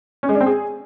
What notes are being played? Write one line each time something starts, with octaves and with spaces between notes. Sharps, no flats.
C#4
G#3
D4
C4
G#4